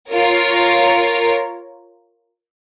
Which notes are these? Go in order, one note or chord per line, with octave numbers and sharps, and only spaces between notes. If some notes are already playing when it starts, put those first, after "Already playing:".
F4 A#4 C#5